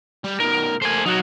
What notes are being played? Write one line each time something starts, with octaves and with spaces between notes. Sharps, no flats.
G3
B2 D#3 A#4
A3 A#3 C5 G#5
F#3 D#4 F#4